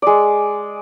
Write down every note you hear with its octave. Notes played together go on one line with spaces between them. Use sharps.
G#3 D5